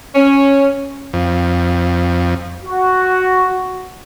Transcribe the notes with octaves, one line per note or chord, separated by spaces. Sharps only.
C#4
F2
F#4